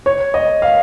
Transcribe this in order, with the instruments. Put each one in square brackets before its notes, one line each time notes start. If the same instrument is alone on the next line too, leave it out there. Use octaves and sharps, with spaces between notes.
[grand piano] C#5
D#5
F5